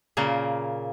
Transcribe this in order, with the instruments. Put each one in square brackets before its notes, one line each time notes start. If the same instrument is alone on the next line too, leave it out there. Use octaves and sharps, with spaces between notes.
[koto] A#2 C#3 A#3